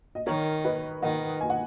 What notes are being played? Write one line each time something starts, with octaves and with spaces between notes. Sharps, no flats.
D#5
D#3 A#4 C#5
B4 D#5
D#3 D#5 F#5
G#5
F#5